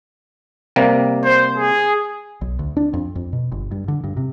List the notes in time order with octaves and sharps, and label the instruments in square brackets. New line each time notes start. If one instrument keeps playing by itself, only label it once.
[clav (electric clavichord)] C3 G3 A#3
[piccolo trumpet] C5
G#4
[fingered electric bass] B1
D2
D4
F2
F2
B2
G1
G2
D3
G2
C3